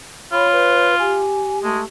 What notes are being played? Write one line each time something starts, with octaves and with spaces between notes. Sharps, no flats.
F4 C#5 B5
B4
G4 G#5
G#3 A3